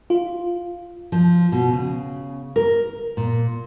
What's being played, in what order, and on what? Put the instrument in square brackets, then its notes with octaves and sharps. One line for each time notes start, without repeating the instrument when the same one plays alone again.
[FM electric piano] F4
[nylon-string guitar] F3
B2
C#3
A#4
A#2